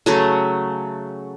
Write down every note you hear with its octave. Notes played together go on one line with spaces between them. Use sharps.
C#3 F#3 A3